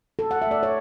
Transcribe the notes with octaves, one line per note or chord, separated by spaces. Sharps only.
A3 A4
F#5
E5
A3 D5
C#5